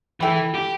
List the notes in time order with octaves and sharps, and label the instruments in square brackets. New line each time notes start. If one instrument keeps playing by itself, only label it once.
[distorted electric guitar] E3 [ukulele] A4 G5 B5
[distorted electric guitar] G4